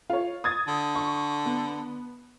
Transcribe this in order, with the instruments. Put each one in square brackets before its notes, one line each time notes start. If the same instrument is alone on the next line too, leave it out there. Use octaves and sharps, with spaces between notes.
[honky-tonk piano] F4 C#5
D#6 G#6 A6
[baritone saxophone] D3
[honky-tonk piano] C#6
B3